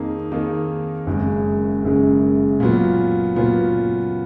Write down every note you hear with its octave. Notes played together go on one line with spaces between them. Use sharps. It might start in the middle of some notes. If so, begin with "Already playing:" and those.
Already playing: F2 D#3 A#3 D#4 G#4
F2 D#3 A#3 D#4 G#4
F#1 F#2 C#3 G#3
F#1 F#2 C#3 G#3
A#2 F#3 B3 F4
A#2 F#3 B3 F4